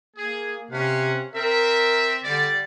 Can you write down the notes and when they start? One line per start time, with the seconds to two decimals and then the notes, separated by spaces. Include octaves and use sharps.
0.16 A#3 G#4
0.71 C3 C#4 F5 F#5
1.34 C4 A#4 E5
2.24 D3 G3 D5